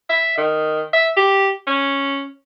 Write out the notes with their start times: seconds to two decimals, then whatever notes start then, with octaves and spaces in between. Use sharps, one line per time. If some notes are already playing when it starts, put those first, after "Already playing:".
0.09 E5
0.37 D#3
0.93 E5
1.17 G4
1.67 C#4